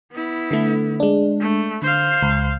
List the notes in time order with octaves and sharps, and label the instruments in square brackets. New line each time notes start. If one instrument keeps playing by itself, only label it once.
[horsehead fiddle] B3 E4
[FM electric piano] D3 A3
G#3 D4
[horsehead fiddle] A3
[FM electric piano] D3 [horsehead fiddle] C5 F5
[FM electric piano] C#2